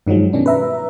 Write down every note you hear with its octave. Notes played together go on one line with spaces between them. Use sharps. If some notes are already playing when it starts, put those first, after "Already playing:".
G2 D#3 F3 F#3 G#3
B2 D#3 C#4 D4
B4 E5 A#5